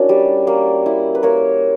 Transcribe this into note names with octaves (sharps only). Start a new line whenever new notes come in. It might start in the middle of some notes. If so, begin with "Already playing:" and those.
Already playing: C#4 D4 E4 F#4 A#4
G3
A#3
E4
B4
A#3 A#4 C#5